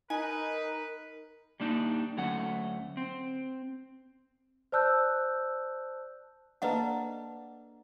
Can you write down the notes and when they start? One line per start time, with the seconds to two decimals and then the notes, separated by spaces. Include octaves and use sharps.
0.10 D#4 A#4 B4 G#5
1.60 G3 A#3 D4 D#4
2.17 D2 F#3 A3 C#4 F#5
2.97 C4
4.72 C5 D5 A5 E6 F#6 G6
6.62 A#3 D4 A4 B4 D#5 F#5